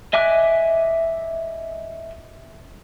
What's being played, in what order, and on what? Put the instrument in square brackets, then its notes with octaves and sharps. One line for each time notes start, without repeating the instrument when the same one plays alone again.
[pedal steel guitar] D#5 E5 G#5 D6 F#6